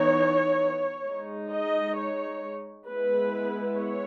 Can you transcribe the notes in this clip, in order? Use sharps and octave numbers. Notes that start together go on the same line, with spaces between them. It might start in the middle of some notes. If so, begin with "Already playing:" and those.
Already playing: E3 B3 D#4 C#5
G#3 D#4
D#5
C#5
G#3 B3 E4 B4
C#5